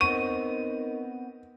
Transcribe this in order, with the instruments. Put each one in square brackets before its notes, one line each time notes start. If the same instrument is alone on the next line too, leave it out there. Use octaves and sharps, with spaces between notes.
[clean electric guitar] B3 C4 [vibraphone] D#4 A#4 D#5 [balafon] C#6 [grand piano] D#7